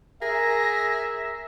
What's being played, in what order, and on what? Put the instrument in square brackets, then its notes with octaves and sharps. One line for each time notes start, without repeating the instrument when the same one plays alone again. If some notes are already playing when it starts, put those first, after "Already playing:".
[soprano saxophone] G#4 [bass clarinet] A#4 [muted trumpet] E5 [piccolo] A#6